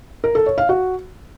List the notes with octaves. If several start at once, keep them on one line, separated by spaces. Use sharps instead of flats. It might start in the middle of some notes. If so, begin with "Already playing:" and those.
A#4
A4
C#5
F5
F#4